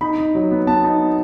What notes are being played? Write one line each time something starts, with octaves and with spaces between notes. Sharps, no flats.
D#4 B5
D#4
F#3
B3
B3 A5
D#4